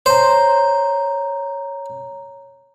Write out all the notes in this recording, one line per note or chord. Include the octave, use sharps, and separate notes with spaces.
C5 C#5 A#5